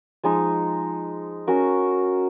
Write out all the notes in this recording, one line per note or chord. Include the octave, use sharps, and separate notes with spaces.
F3 G#3 D#4
C#4 F#4 A#4